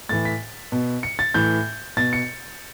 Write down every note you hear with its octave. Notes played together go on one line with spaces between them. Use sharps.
A2 E3 A6
B6
B2
C#7
A6
A2 E3 G6
B2 A6
C#7